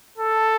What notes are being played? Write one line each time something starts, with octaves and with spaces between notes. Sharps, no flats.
A4